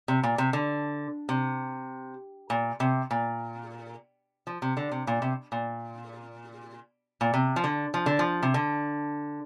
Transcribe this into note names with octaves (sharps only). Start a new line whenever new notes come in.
C3
A#2
C3
D3
C3
A#2
C3
A#2
F3
C3
D3
C3
A#2
C3
A#2
A#2
C3
F3
D3
F3
D3
F3
C3
D3